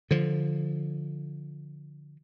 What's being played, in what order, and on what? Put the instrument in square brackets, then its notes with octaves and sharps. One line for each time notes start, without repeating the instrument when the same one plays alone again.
[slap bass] D3 F3